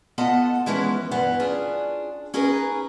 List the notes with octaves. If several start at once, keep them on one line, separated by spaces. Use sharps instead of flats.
B3 F4 A4 D#5 F#5 A5
E3 F3 G#3 B3 C#4 E4
D2 G2 E3 B3
C#4 D4 F4 G#4
C#4 D#4 G#4 A#4 B4